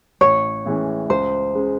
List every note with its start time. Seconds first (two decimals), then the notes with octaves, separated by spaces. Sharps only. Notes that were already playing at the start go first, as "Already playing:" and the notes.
0.21 A1 C#5
0.65 A2 E3 G#3 C#4
1.10 C#2 C5
1.55 C#3 G#3